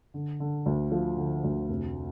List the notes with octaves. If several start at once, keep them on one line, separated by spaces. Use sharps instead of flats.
D3
D3
D2
F3
D3
D2
F1